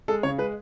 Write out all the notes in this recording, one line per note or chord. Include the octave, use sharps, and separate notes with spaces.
G#3 A4
C#3 C#5
G#3 B4